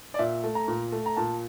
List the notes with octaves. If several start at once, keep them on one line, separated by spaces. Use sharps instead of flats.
D5
A#2 E5
A3
A#5
A#2
A3
A#5
A#2 A5